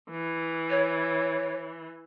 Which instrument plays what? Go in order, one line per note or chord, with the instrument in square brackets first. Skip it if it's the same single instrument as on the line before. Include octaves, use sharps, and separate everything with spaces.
[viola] E3
[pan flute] C#5